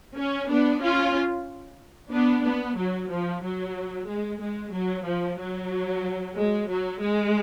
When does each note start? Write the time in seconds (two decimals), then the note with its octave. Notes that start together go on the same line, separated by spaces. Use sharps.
0.16 C#4
0.49 B3 D4
0.82 C#4 F4
2.12 B3 D4
2.44 B3
2.78 F#3
3.10 F3
3.43 F#3
4.08 G#3
4.41 G#3
4.73 F#3
5.06 F3
5.39 F#3
6.36 G#3
6.70 F#3
7.02 G#3